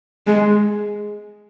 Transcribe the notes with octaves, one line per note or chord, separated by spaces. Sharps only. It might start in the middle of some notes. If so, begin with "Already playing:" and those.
G#3